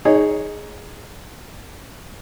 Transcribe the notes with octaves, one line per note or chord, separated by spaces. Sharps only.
D#4 G#4 C#5